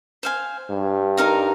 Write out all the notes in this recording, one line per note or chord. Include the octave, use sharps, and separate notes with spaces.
C5 F5 G#5
G2
D#4 A#4 F5 A#5